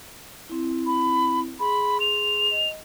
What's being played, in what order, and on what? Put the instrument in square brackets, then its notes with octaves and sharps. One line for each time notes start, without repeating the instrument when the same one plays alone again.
[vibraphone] C4 E4
[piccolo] B5
[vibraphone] G#4 C6 [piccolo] B5
[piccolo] F7
[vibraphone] D#5